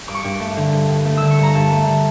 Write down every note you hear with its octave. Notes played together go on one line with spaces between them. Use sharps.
G2 D6
C#6
G2 D6
A3
D3
G2
G2
A3
D3 E6
C#6
G2 A#5
G2 A5
A3
D3